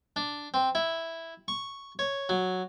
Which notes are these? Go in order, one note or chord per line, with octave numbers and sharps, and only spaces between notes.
D4
C4
E4
C#6
C#5
F#3